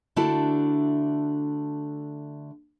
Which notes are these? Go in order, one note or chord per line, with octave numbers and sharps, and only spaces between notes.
D3 A3 D4 E4 F#4 A5